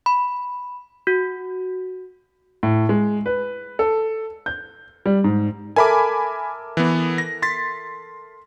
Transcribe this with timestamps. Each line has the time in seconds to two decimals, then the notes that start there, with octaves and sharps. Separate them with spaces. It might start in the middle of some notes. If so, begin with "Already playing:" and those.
0.06 B5
1.07 F#4
2.63 A2
2.89 G#3
3.26 B4
3.79 A4
4.46 G6
5.06 G3
5.24 G#2
5.76 A4 A#4 E5 G#5 B5 D6
6.77 E3 B3
7.18 A#6
7.42 C6 A6 B6